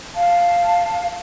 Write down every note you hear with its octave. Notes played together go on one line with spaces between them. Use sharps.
F5 A5